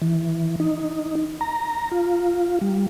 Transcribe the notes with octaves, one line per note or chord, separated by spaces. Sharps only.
E3
D#4
A#5
F4
G3